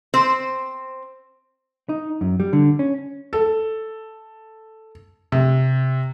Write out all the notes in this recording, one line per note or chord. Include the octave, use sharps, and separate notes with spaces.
C4 C5
D#4
F#2
G3
D3
C#4
A4
C3